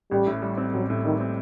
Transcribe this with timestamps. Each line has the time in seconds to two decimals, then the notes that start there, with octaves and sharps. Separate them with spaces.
0.11 A1 G3
0.27 A2
0.42 G3
0.57 C4
0.74 A1 F#3
0.90 A2
1.05 D#3 G3
1.20 C4